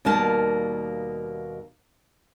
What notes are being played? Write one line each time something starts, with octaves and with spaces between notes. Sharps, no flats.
D#2 B2 G3 A#3 A#4 A5